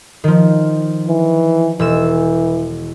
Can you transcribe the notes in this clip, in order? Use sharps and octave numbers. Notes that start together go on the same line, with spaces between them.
D#3 F3
E3
E1 E3 E6 E7